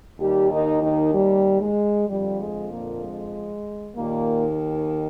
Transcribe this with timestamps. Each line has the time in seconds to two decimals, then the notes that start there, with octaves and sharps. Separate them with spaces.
0.19 D#2 D#3 G3 G4
0.51 D#3 D#4
0.82 D#3 D#4
1.14 G3
1.60 G#3
2.08 F2 D3 F3 G3
2.40 G#3
2.70 A#2 A#3
3.02 G#3
3.96 D#2 A#2 D#3 A#3